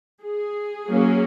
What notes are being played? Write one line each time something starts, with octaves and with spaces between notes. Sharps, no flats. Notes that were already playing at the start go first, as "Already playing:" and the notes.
G#4
F#3 A#3 C#4